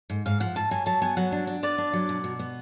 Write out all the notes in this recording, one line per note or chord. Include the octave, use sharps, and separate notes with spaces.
G#2
G#2 F5
F3 F#5
G#2 A5
F#3 G#5
F#3 A5
B3 G#5
F#3 F#5
D4
D4
B3 D5
D4
F#3
B2
B2
B3